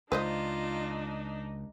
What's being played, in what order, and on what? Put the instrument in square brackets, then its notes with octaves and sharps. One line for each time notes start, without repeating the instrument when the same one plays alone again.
[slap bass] C#2 [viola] D4 D#4 [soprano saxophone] F4 [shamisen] B4 C5 D#5